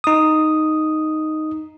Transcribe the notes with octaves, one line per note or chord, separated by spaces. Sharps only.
D#4 D#6